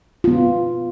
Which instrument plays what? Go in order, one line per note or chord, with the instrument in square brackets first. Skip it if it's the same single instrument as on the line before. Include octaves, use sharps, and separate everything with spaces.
[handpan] B3 F4